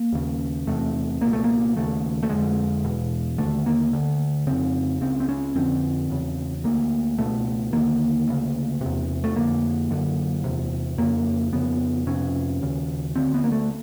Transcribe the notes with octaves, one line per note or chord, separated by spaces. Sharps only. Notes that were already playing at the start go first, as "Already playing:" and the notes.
Already playing: A#3
D#2 C#3
E2 C3 A3
C#2 B2 A#3
A3
A#3
D#2 C#3 A3
A3
F2 D3 G#3
E2 B2
D3 A3
D#2
A#3
D2 D3
F2 C#3 C4
C#2 C#3 C4
C4
C#4
F2 D3 C4
E2 C#3
D2 D3 A#3
C#2 B2 A3
D#2 D3 A#3
D2 C#3
E2 C3
A3
F2 D3 A#3
F#2 D3
E2 C3
F2 C#3 A#3
F2 C#3 B3
F2 C3 C#4
D#2 C#3
D2 D3 C4
B3
A#3
A3